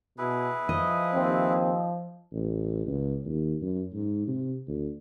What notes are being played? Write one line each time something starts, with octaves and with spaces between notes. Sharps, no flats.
B2 E4 G#4 B4
F3 D#5
D#2 C4
A1
C#2
D#2
F#2
G#2
C3
D2